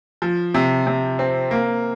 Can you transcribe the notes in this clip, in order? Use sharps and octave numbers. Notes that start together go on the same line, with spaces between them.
F3
C3
C3
C4
A#3